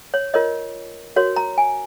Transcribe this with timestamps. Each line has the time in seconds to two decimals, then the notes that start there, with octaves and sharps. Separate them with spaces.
0.14 C#5
0.34 F4 A#4 C#5 D#5
1.16 F#4 A#4 C#5
1.36 A#5
1.58 G#5